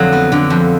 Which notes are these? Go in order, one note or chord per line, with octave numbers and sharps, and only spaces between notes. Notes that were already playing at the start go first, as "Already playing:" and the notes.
Already playing: F2 D3 F#3
B3
D3
F2